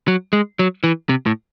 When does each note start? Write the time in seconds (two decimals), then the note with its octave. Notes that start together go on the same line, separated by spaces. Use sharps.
0.08 F#3
0.33 G#3
0.59 F#3
0.84 E3
1.09 C3
1.26 A2